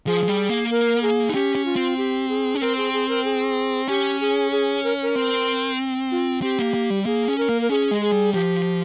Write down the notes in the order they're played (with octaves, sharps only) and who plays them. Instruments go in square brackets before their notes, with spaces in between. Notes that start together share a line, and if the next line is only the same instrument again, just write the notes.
[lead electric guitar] F3 [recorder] G#4
[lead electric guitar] F3
G3
A#3
[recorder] A#4
G#4
[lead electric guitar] D#4
[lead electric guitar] C#4 [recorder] G4
[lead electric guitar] C#4
[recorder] F4
[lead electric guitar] C4
[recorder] G4
G#4
[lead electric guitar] C#4
[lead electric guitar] C4 [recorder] A#4
[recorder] G#4
G#4
A#4
G#4
[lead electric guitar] C#4 [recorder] G4
[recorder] G#4
G#4
A#4
A#4
[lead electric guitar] C4
[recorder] F4
[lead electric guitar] C4 [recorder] G4
[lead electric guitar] A#3
A#3
G3
[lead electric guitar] A#3 [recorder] G#4
[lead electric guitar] C#4
[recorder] A#4
[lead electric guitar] A#3
[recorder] A#4
[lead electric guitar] C#4 [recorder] G#4
[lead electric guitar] G#3
[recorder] G#4
[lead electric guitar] G3
[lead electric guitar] F3 [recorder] G4